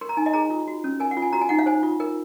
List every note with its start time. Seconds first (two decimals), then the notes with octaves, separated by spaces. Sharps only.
0.01 A#4 C6
0.09 A#5
0.17 D#4 G#5
0.26 D#5
0.33 G#4 A#5
0.50 F4
0.67 F#4
0.84 C#4
1.00 A#4 G#5
1.11 F#5
1.17 F4
1.22 G#5
1.33 F#4 A#5
1.41 G#5
1.49 D#4 F#5
1.59 F5
1.66 C5 G#5
1.83 F4
2.00 A#4